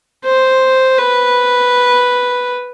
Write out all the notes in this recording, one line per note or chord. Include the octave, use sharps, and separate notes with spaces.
C5
B4